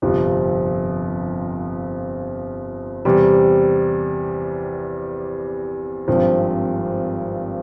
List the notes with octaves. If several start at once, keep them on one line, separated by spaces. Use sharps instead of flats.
G1 F2 C3 F3
E2 C3 G3
G#1 G2 F3 C4